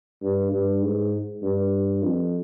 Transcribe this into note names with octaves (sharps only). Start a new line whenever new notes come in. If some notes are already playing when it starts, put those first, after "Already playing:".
G2
G2
G#2
G2
F2